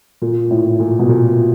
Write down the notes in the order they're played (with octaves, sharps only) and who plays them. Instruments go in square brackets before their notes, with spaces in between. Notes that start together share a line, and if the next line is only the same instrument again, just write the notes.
[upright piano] A#2
A2
A#2
B2
A#2